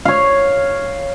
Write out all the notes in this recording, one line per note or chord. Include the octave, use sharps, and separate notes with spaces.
C#5 F5